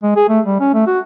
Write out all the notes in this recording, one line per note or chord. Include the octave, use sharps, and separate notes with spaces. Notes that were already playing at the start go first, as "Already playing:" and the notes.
G#3
G#4
A3
G3
C#4
A3
F#4